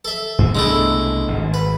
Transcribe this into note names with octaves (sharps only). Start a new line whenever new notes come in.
A4 E5
G2
C2 B2 G#3 A3 D4 E4
G#1
B4